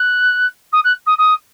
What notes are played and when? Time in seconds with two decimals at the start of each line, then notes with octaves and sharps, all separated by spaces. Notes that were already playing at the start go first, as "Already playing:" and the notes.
Already playing: F#6
0.72 D#6
0.84 F#6
1.06 D#6
1.18 D#6